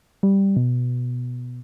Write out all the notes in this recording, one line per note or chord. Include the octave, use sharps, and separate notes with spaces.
G3
B2